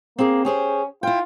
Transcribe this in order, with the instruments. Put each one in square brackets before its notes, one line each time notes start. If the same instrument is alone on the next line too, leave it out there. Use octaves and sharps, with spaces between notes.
[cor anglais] A#3 [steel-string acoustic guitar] C4 G#4
[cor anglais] C#4 [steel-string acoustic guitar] G4 G#4 C5
[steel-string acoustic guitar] E4 G5 [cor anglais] F4